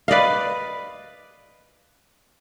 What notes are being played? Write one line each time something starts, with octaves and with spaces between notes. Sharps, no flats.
B4 D5 D#5 F5